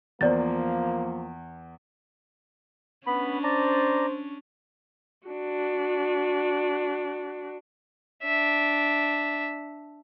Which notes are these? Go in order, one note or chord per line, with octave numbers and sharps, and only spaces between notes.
E2 F3 A#3 C5 D5 A6
B3 C#4 D4 B5
C5 D5 A5 A#5
D4 F#4
D4 E5